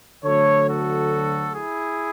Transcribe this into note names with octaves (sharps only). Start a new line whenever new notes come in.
D2 D3 F#3 A3 A4 C#5
F#4 A4
E4 G#4